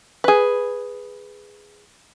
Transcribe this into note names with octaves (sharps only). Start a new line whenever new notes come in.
G#4 B4